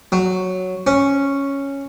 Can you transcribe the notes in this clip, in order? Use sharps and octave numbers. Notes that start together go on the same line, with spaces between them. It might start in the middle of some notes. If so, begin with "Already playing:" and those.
F#3
C#4